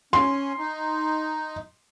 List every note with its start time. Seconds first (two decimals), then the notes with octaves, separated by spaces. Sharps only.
0.13 C#4 C6
0.58 D#4